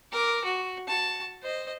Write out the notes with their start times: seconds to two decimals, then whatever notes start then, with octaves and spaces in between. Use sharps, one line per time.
0.12 A#4 D6
0.44 F#4
0.87 F#4 A5
1.42 C5 D#5